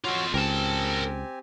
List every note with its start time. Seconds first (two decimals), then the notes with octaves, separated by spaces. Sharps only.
0.05 F4 F#4 A4 C#5 D6
0.34 C#2 C4 G4 A#4 G#5 A5